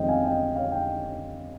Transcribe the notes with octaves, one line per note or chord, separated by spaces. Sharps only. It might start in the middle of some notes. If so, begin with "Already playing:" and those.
Already playing: G1 F2 D#3 G#3 C4 D#5 G5
F5 G#5
D#5 G5
C#5 F5
G5